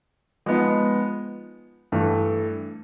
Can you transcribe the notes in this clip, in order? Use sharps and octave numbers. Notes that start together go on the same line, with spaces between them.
F3 G#3 B3 D#4
G2 E3 A3